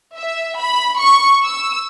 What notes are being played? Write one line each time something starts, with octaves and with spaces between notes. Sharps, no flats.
E5
B5
C#6
E6